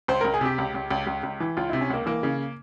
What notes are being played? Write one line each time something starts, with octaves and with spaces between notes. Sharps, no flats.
C#2 C5
C#2 A#4
G#4
C3 G4
C#2
C#2
C#2
C#2
C#2
E3
C#2 F4
C3 E4
C#4
C#2 A#3
E3 A#3
C#3